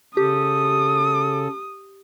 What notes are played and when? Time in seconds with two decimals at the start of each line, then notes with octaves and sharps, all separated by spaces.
0.17 C#3 G4 A4 D#6